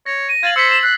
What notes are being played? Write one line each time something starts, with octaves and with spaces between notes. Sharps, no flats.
C#5 A#6
D#7
F5 G#6 A6 F#7
C5 E6 B6 C#7
E7
F#6 C7